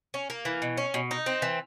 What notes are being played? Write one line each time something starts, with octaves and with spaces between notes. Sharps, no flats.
C#4
A#3
E3
B2
C#4
B2
D#4
C4
E3